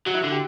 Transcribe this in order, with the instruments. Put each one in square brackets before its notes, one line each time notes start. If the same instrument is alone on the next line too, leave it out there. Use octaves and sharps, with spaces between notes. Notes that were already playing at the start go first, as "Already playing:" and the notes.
[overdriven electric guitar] F#3 [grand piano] F#4
[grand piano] E4
[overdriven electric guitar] D3 [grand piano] F#4
[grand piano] G4